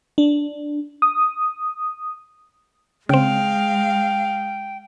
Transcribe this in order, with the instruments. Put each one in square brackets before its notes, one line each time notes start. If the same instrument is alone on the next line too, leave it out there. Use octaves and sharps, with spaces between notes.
[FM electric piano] D4
D#6
[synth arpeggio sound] C#3 C4 [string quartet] G#3 F5 [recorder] G5